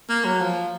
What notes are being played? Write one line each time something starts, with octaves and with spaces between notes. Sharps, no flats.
A#3
F#3
F3